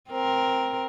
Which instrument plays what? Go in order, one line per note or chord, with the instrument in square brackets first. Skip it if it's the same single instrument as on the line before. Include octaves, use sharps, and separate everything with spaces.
[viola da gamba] C4 A#4